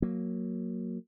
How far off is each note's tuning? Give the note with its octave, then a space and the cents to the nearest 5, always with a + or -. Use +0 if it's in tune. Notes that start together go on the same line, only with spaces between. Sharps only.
F#3 -5 A#3 +0